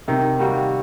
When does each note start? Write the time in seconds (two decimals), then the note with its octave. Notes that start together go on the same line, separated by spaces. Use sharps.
0.08 C3 D#3
0.39 G3 A#3 F#4